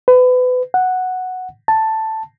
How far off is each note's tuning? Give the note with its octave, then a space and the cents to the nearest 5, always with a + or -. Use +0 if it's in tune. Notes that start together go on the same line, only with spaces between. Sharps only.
B4 +30
F#5 -5
A5 +5